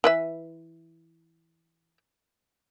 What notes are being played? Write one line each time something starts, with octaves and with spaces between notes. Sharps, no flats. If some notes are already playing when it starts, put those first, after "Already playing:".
E3 B4 E5